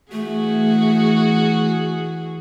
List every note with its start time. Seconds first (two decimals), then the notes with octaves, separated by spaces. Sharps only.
0.12 E3 A3 F#4 G#4